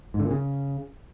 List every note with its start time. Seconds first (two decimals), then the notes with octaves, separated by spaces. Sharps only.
0.14 G#2
0.20 D3
0.25 A#2
0.31 C#3